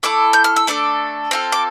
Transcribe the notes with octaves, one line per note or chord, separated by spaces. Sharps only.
A3 E4 A4 D6
G6
F6
E6
A3 D4 A4 D6
C4 F4 A4
D6